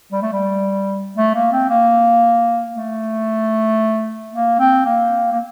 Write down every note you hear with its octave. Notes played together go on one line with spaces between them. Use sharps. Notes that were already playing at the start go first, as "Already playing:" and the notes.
G3
A3
G3
A3
A#3
C4
A#3
A3
A#3
C4
A#3
A#3